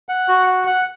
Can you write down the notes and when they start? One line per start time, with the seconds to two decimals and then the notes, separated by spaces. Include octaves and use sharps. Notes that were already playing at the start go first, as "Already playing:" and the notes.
0.09 F#5
0.28 F#4
0.47 F#5
0.67 F#5